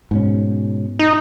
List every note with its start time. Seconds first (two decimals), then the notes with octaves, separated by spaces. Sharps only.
0.11 G#2 B2 C#4
0.99 D#4